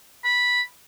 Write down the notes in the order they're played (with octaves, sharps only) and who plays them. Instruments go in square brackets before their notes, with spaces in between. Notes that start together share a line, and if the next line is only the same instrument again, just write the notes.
[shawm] B5